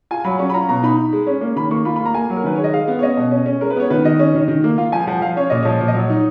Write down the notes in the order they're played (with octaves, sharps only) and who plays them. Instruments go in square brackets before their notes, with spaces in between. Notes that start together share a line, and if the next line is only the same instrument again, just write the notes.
[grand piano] F4 G#5
F#3 B5
C#4 C#6
B5
F4 A#5
B2 A#5
D#4 B5
D#4
G#3
C#4
A#3
D#3 B5
A#3 C#6
F4 B5
B5
A#3
A#5
A#3 G#5
F#3
A#4
D#3 B4
G#3 C#5
D#5
G#3 F5
B3
C#5
C#4 D#5
B2
C#4
C#4
G#3 A#4
B4
B3 C#5
D#3 B4
D#3 D#5
C#4
D#3
D#3
A#3
F4 F5
F3 G#5
F3 F#5
F3 F5
C#4 C#5
A#2 D#5
F3 C#5
A#2
D#5
F#3 C#5
D#4